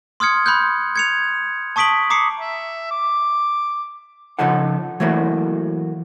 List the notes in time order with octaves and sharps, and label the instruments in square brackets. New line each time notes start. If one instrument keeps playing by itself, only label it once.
[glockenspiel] C6 D#6 F6 G#6 C#7
B5 C6 F#6 G6
G#6 C#7 F7
A5 C#6 D#6 B6 D7 F#7
A#5 D6 D#6 C7 C#7
[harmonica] E5
D6
[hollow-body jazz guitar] C#3 F3 D#4 A4 F#5
E3 F#3 A3 A#3 E4 F#4